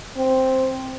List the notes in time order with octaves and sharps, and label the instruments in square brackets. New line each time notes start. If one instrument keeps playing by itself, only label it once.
[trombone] C4